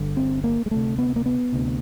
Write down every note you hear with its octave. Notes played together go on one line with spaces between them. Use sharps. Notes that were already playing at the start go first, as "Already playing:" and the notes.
Already playing: G1 G2 D3
C4
A#3
G#3
D2 C3 A3
B3
A#3
B3
D2 C3